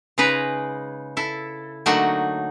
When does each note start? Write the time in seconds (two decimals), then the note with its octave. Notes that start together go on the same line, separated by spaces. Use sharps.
0.18 C#3 G#3 D#4 B4 A#5
1.17 E4 A4
1.86 D3 F#3 A3 A#3 D#4 F#4